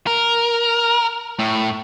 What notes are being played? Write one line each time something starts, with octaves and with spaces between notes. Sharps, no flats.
A#4
A2